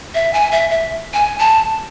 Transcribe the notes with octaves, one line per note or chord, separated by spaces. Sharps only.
E5
G#5
E5
E5
G#5
A5